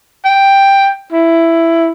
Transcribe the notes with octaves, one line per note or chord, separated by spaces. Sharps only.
G5
E4